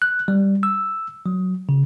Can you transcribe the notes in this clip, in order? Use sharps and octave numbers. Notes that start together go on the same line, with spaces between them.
F#6
G3
E6
F#3
C#3